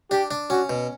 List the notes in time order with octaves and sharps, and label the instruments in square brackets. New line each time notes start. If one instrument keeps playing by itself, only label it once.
[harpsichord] D4 [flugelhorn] G4
[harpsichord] D4
[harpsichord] C#4 [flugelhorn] F#4
[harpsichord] B2